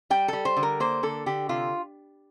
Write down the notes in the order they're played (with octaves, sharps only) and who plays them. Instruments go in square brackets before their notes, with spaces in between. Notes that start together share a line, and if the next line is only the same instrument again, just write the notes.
[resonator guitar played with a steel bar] G3 G5
G3 A4
C5
D3
A#4
A#3 C5
D3 A4
D3 G4
C3 F4